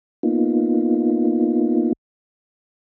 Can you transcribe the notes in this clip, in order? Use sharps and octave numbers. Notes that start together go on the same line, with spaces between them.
A#3 B3 D#4 F4